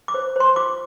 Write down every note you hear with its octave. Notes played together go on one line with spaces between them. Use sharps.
D6
C5
C5 C6
F4 D6